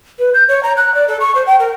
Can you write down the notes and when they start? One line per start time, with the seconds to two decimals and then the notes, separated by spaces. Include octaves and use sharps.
0.19 B4
0.34 G6
0.48 C#5
0.63 A#5
0.77 F#6
0.94 D5
1.08 A4
1.20 C#6
1.35 C5
1.47 G5
1.60 A#4